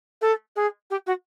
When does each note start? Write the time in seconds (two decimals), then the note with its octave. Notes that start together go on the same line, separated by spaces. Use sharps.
0.21 A4
0.56 G#4
0.90 G4
1.06 F#4